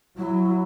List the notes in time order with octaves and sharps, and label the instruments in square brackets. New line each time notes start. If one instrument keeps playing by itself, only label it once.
[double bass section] F#3 [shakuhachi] E4